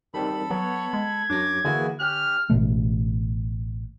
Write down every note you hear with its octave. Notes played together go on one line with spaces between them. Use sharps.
D#3 G3 C4 A4 B5
F#3 B3 C#5
G#3 G#6
F#2 F#3 D4 D6 A#6
D3 E3 A#3 E4 F#4 G#4 G#5
C#4 G4 F6 F#6
A1 B2 A3